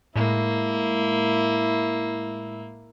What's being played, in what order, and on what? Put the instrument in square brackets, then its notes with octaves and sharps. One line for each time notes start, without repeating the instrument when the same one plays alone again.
[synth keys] A2 G#3 [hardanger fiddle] A#3 [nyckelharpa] E4